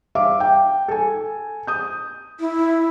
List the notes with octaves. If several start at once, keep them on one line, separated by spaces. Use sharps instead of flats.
E5 F5 D6
G5
A4 G#5
D#6 G6
E4